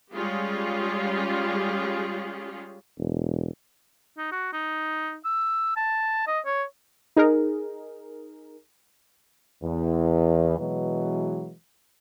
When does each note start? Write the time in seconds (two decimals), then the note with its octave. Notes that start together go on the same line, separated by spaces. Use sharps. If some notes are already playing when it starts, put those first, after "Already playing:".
0.14 G3 G#3 C#4 F4 G4 G#4
2.99 E1
4.18 D#4
4.32 F#4
4.53 D#4
5.25 E6
5.77 A5
6.27 D#5
6.46 C#5
7.16 D#4 G#4 A#4
9.63 E2
10.58 B2 E3 F#3 G#3